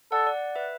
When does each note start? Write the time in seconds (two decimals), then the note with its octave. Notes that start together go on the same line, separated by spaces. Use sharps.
0.12 A4 D5 F#5
0.27 D5 F#5
0.55 B4 E5